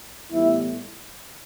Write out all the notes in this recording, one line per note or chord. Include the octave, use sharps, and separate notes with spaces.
A2 E3 G3 B3 E4